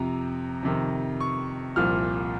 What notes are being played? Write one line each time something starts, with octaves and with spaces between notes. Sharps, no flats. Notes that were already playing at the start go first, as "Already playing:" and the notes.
Already playing: F2 C3 F3 A#5
F2 C3 D#3
C#6
C2 A#2 F3 F6